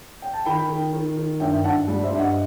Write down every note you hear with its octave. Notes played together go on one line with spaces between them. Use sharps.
G5
A5
D#3 G5 B5
D#3
D#3
D#3
G2 E5 G5
G2 F#5 A5
G3
C5 E5
G2
D#5 F#5